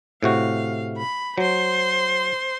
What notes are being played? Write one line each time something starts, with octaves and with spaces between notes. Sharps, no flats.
A2 C3 F#4 F5
B5
F#3 C5 C6